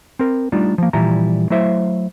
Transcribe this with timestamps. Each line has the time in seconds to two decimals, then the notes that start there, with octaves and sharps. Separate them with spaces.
0.19 C4 A#4
0.52 G3 A3 D4 D#4 F4
0.78 F3 A#3
0.93 A#2 E3 F3 G3 E4 A#5
1.50 F#3 A3 E4 C5 E5 F5